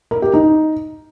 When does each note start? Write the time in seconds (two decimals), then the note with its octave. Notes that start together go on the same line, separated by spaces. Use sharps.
0.11 A#4
0.22 G4
0.34 D#4